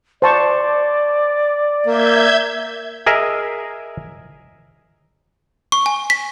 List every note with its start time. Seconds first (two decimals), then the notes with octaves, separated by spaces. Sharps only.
0.22 C5 D5 A5 C#6
1.86 A#3 E5 G6 G#6
3.06 G#4 A#4 D#5 E5
5.72 C#6
5.86 G#5
6.10 B6